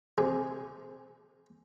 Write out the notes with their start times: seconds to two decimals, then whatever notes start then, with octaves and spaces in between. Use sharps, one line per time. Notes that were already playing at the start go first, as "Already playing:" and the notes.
0.18 C3 G#4